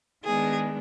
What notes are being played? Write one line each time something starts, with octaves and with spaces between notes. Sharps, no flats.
D#3 G#3 B3 D4 G#4